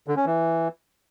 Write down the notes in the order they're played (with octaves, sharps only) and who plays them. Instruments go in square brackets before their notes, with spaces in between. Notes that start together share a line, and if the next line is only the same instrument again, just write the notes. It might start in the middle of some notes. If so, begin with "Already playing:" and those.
[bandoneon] D3
C#4
E3